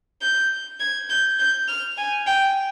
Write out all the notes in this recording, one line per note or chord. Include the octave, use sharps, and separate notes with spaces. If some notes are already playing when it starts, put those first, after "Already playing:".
G6
G#6
G6
G6
F6
G#5
G5